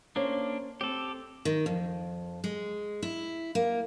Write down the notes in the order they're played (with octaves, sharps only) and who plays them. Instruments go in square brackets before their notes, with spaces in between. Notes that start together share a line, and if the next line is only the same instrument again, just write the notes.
[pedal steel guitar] A#3 D4 [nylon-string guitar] C#4 C5
[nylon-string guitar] C4 [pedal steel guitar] G4 A4
[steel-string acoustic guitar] D#3
F2
G#3
E4
A#3